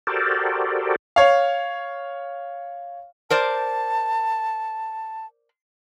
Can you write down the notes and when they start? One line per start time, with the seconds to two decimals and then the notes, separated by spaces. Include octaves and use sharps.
0.07 F#4 G4 A4 A#4 C5 D5
1.16 C#5 F5
3.30 A#4 C5 D5 A5